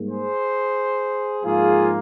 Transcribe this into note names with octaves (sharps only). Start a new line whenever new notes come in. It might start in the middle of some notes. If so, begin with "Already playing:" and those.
Already playing: G#2 G3 A#3
G#4 C5
G#2 F3 A#3 F4 G#4